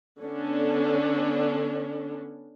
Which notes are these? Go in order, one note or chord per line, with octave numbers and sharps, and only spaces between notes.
D3 B3 C#4 D4